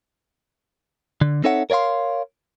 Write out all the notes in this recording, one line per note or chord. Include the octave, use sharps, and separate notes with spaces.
D3
C4 D#4 A4 C#5 E5 F#5
A#4 C#5 D5 F5 C6